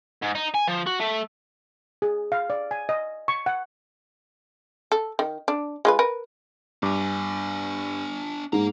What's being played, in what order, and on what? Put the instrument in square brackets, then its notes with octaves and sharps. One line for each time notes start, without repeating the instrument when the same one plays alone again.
[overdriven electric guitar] G#2
D#4
G#5
F3
F#4
A3
[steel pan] G#4
F5
D5
G#5
D#5
C#6
F#5
[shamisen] A4
D#3
D4
G#3 F4 B4
A#4 B4
[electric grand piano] G2 D6 [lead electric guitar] D4 G#5
[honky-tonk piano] G#2 [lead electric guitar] A#3 A#5